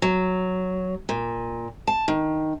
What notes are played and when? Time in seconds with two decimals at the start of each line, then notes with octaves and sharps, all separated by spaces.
0.02 F#3
1.09 A#2
1.87 A5
2.08 D#3